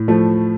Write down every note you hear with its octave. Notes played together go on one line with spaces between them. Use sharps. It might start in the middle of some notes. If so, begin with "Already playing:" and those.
Already playing: A2
F3 A3